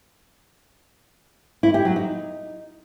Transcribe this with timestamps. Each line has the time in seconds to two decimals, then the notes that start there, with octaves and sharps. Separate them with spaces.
1.63 E4
1.74 G4
1.85 F#3
1.96 D#4